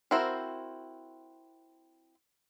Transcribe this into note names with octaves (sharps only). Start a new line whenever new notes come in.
C4 E4 F#4 A#4 C5